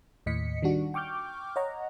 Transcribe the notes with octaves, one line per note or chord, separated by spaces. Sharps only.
D#2 A2 D#5 B6 C#7
D#3 G3 D4 F#4
G5 C#6 D6 F6 G6
C#5 D#5 F#5 A#5